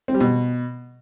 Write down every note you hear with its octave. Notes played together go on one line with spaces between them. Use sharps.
C4
G3
B2